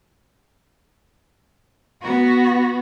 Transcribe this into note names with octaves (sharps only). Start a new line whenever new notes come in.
B3 F#4